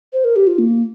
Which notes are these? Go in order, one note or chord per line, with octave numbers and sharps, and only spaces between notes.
C5
A#4
G4
F4
A#3